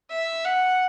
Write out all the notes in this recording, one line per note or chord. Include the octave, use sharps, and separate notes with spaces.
E5
F#5